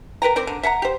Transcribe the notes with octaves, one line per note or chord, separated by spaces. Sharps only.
A#4 B4 G5 A#5
C4 A#4 C5 D5
D3
E5 F#5 G#5 A#5
G4 C5